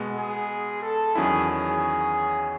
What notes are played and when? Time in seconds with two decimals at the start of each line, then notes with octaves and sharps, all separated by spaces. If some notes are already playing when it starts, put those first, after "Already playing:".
Already playing: B2 G#3 B3
0.15 G#4
0.82 A4
1.15 E2 D#3 F#3 C#4 E4 G#4
1.49 G#4